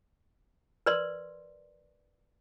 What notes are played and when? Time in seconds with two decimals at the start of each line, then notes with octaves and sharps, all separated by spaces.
0.86 A#4 B4 D5 C6